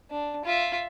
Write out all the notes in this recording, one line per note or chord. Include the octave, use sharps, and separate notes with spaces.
D4
F4 E5